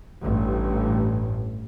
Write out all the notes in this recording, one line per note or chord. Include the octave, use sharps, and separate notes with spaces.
A1 G2